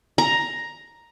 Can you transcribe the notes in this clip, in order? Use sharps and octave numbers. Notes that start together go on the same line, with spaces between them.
A#5